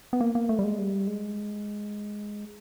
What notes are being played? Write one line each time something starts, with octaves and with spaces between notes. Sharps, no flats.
B3
A#3
A#3
A3
G3
G#3
G3
G#3